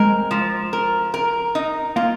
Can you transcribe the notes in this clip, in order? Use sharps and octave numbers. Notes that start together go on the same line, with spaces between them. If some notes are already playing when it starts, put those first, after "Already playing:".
Already playing: G#3 C4 A#4
F3
A#4
A#4
D#4
A#3 F4